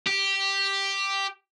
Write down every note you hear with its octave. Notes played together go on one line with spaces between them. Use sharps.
G4